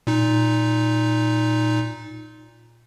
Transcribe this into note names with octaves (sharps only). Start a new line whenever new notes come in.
A#2 D#4